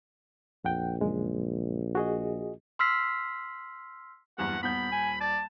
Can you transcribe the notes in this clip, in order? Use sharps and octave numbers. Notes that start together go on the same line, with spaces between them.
A#1 F2 F#5 G5
F#2 C#3 G#3
F#4 G#4 D#5
C6 E6 F6 B6 C7
F#1 E2 G2 F#5
D#1 B3 B5 G6
G#5
D5 A5